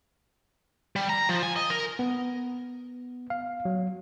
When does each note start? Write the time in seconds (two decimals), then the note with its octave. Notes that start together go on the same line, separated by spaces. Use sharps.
0.96 G3
1.10 A#5
1.29 F3
1.43 G#5
1.56 D#5
1.70 A#4
1.99 B3
3.30 F5
3.65 F#3